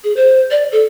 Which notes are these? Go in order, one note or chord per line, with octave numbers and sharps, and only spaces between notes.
G#4
C5
D5
A4